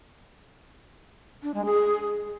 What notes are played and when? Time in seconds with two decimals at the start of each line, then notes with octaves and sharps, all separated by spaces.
1.43 D4
1.54 G#3
1.65 G#4